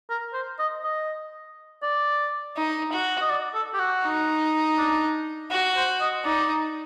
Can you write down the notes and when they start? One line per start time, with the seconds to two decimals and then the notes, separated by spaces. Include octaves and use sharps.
0.09 A#4
0.33 C5
0.59 D#5
0.83 D#5
1.82 D5
2.56 D#4
2.92 F#4
3.21 D#5
3.30 D5
3.54 A4
3.74 G4
3.79 F#4
4.04 D#4
4.78 D4
5.51 F#4
5.76 C5
6.01 D#5
6.25 D#4 D5